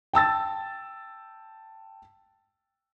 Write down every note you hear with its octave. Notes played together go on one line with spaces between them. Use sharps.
G5 A5 E6 A6